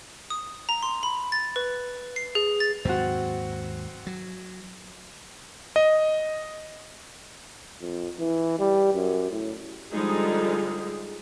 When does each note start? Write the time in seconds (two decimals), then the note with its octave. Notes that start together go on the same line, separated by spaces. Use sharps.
0.30 D#6
0.69 A#5
0.83 C6
1.03 B5
1.32 A6
1.56 B4
2.16 C7
2.35 G#4
2.60 A6
2.85 D#2 G#2 F#3 C4 F#4
4.07 F#3
5.76 D#5
7.81 F2
8.19 E3
8.59 G3
8.94 F#2
9.31 A2
9.91 D3 F3 G3 G#3 D#4 G#4